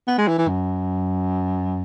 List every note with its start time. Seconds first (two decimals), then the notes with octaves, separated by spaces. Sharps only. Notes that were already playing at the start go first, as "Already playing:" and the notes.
0.07 B3
0.18 G#3
0.28 E3
0.38 E3
0.48 F#2